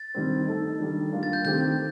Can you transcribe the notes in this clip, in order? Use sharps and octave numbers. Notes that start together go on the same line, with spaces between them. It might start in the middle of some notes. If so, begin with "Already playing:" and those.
Already playing: A6
D#3 G3 C4
A3 D#4 A4
D#3 G3 D4
G3 A#3 D4 F4
A6
G6
D#3 A3 C4 G4 G6